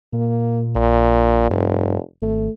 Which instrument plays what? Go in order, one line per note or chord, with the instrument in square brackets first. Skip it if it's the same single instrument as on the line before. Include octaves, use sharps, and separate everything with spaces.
[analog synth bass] A#2 [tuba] A#3
[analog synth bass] A#1 [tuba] A#2
[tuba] F1 [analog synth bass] G2
[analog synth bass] G#1 [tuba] A3